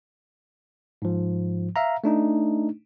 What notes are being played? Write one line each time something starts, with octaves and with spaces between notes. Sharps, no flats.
G#2 F3
E5 F5 A#5
A3 D4 D#4